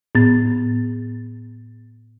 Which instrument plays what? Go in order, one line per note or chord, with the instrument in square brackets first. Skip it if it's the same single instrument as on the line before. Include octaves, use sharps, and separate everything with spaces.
[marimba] A2 B3 A6